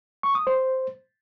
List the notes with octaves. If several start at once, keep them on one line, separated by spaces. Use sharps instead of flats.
C#6
D#6
C5